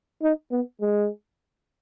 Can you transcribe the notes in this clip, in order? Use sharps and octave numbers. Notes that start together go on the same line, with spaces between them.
D#4
B3
G#3